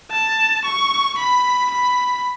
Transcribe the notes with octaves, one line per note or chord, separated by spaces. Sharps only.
A5
C#6
B5
B5